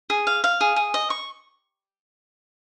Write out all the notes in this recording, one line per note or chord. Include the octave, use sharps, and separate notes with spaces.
G#4
F5
F5
G#4
G#4
D#5
C#6